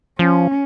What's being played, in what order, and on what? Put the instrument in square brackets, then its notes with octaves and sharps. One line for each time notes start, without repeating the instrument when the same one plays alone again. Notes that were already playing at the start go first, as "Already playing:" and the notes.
[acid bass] F3 [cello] C#4